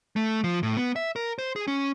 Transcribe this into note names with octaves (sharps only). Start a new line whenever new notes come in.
A3
F3
A2
B3
E5
A#4
C5
G#4
C#4